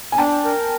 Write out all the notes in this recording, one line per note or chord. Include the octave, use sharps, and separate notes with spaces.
G#5
D4 G5 A5
A#4